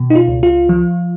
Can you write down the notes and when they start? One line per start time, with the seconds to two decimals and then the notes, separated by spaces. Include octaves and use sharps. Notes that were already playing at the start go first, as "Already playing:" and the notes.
Already playing: B2
0.10 D#4
0.15 F4
0.28 C#2
0.43 F4
0.69 F3